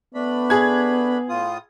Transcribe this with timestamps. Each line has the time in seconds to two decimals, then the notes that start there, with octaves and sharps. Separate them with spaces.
0.14 A3 B3 D4 B5
0.50 G#4 G#6
1.29 A2 F4 D#6